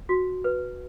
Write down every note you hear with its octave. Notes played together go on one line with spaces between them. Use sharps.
F#4
B4